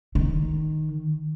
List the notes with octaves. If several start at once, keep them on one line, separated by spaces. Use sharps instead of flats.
D#3